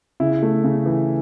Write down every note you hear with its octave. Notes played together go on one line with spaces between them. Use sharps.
C#3 E4
A3
C#3
E3